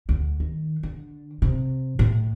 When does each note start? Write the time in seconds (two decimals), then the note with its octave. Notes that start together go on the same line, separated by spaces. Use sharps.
0.09 D2
0.40 D#3
0.83 D3
1.42 C3
1.99 A2